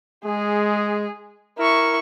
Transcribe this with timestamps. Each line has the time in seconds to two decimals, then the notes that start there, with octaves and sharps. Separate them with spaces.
0.25 G#3 G#4
1.59 E4 A#4 C#6